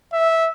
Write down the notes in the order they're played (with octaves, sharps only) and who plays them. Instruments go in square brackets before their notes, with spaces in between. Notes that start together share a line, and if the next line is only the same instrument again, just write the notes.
[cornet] E5